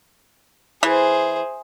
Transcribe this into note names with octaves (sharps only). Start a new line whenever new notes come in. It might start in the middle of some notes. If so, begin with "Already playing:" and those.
E3 G#4 C5